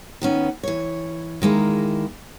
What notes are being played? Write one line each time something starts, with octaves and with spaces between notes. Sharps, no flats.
D#3 B3 C#4
E3 C#5
D#3 G#3 A#3 E4